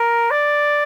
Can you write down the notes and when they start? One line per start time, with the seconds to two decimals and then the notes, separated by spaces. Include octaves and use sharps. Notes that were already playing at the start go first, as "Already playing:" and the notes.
Already playing: A#4
0.31 D5